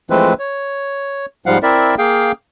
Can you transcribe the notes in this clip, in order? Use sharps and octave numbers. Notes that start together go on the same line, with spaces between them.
E3 F3 G#3 A3 C4 B4
C#5
G#2 F3 G3 F5 F#5
C4 E4 A#4 D5 E5
A#3 G#4 F5 G5